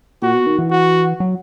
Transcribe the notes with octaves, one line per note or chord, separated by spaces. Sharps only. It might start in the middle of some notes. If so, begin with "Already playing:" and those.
A#2 F#4
B2
D#3
E3
F#4
F#3